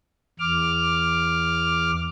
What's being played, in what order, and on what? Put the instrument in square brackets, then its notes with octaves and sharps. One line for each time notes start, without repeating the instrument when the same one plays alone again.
[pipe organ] E2 D6 F6